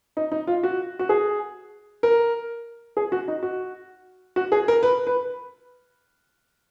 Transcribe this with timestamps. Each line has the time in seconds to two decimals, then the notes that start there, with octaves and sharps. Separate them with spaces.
0.17 D#4
0.32 D#4
0.47 F4
0.63 F#4
0.99 F#4
1.09 G#4
2.03 A#4
2.97 G#4
3.12 F#4
3.28 D#4
3.43 F#4
4.36 F#4
4.52 G#4
4.68 A#4
4.83 B4
5.07 B4